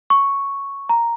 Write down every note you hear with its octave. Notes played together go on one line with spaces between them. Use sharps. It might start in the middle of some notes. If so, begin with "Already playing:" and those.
C#6
A#5